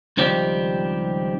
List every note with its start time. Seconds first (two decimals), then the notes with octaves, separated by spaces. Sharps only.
0.17 C#2 D#3 F3 G3 C4 G4